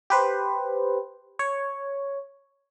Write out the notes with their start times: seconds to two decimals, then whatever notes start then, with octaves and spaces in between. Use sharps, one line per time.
0.10 G4 B4 C5
1.39 C#5